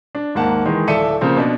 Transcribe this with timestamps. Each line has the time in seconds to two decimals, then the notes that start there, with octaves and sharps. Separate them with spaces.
0.15 D4
0.35 D#2 G#2 A#3 F#5 A5
0.65 D#3 E3 G#3
0.87 D1 A4 D5 E5 C#7 D#7
1.21 C#3 F3 A#3 C4
1.37 B2 D4